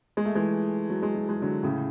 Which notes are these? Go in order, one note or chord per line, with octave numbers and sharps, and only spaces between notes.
G#3
A3
E3 G#3
F#3
G#3
F#3
G#3
D3 F#3
A2 C#3